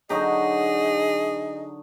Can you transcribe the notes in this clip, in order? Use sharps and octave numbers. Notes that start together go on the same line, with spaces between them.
D3 F#3 D#4 G#4 D#5